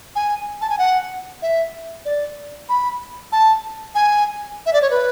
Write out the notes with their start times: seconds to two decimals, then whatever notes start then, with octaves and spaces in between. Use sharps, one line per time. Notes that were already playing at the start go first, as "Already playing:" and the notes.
0.16 G#5
0.61 A5
0.70 G#5
0.79 F#5
1.42 E5
2.05 D5
2.69 B5
3.32 A5
3.95 G#5
4.66 E5
4.73 D5
4.82 C#5
4.91 B4